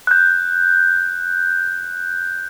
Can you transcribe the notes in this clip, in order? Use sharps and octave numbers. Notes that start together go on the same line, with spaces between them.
F#6 G6